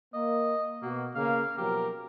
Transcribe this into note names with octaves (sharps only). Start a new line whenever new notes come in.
A#3 D#5
B2 A#3 F#4
C#3 A#3 F5
B2 F3 F#3 G4 A#4